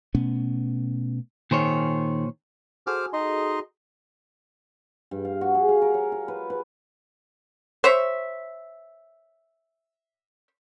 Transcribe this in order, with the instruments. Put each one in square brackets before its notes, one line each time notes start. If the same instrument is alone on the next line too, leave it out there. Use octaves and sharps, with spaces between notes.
[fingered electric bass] B2 A3 B3 C#4
[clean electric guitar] A#2 C5 C#5 [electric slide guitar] D#3 G#4
[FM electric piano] F#4 G#4 A4 [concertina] C5 D6 F6
[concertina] D#4 D#5 C6
[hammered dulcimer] G2
F5
F#4
G#4
F5
A#4
C#5
F4
B4
B4
[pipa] C5 C#5 E5